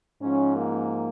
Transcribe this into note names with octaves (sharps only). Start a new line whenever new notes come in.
G#2 F3 C#4
A#3